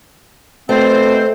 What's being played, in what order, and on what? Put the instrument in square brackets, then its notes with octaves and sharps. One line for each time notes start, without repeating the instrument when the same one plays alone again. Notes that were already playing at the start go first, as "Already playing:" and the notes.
[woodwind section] B2 C4 [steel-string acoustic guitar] A3 [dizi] C5